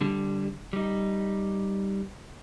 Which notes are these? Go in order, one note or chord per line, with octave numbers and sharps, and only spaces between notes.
D3 G3
G3 D#4